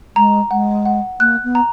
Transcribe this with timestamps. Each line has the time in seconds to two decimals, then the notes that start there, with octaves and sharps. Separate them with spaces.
0.16 G#3 A#5
0.51 G#3 F#5
0.85 F#5
1.20 A#3 F#6
1.43 B3
1.55 A#5